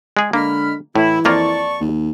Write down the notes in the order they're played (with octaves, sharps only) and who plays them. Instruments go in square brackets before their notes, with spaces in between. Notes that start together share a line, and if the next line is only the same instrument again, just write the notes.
[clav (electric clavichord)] G#3 G#4
[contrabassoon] D3 [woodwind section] G#3 B5 F6 [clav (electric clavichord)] A#3
[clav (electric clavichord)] A2 [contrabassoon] E3 [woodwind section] E4
[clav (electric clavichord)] F2 A#3 F4 [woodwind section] D5 A5 C#6
[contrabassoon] D#2